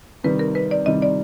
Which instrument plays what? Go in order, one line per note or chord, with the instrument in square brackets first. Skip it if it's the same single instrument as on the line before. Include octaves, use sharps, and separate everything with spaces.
[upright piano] C3 D#3 G3 [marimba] B4
[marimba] A#4
B4
D5
[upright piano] C3 D#3 G3 [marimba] D#5
[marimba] D5